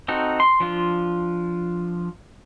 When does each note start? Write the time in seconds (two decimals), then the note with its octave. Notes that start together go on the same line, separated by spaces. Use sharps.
0.08 C4 D#4 F#4 A4
0.40 C6
0.60 F3 D4 F4